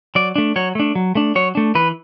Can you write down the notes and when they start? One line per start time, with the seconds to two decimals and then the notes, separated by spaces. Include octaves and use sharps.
0.15 F#3 D5
0.36 A3 D4
0.56 F#3 C#5
0.75 A3 D4
0.95 F#3
1.15 A3 D4
1.35 F#3 C#5
1.55 A3 D4
1.75 E3 B4